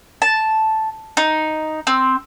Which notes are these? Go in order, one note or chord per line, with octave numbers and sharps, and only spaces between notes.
A5
D#4
C4